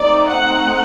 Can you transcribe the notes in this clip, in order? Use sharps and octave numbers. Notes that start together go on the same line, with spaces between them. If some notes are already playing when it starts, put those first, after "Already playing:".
Already playing: A3 C4 D#4 D5
F#5